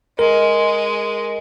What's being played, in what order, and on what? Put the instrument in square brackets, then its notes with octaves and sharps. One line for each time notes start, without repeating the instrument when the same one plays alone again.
[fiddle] G#3 [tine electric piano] A#4